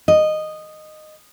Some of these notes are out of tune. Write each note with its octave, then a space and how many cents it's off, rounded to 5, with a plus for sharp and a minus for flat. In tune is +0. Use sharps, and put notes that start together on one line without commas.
D#5 -10